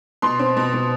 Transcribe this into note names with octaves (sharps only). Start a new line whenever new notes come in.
B2 C6
C4
B2
B2